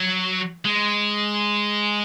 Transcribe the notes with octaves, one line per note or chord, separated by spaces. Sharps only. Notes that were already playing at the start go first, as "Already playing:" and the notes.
Already playing: F#3
G#3